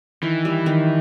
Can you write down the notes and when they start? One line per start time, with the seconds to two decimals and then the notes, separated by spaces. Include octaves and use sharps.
0.22 D#3 E3
0.45 G3
0.66 D#3